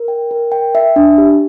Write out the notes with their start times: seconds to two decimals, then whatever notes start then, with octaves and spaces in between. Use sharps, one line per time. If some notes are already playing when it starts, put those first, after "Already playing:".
Already playing: A#4
0.08 G5
0.31 A#4
0.52 G5
0.75 E5
0.96 D4
1.18 G4